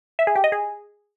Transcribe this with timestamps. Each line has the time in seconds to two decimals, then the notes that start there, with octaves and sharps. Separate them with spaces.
0.19 E5
0.27 G#4
0.36 G4
0.44 D#5
0.52 G#4